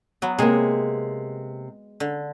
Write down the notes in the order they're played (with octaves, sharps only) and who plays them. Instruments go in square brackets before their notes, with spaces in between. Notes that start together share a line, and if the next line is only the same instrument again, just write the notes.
[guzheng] F#3 B3
[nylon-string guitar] C3 A#3 [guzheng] G#3 G#4
[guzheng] D3